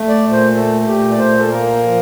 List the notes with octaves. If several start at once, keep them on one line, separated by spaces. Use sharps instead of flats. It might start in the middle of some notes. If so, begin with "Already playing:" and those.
Already playing: A3
D5
A#2
C5
A3 A4
A#2 G4
D5
A#2 C5
A4
A#3 A#4
F3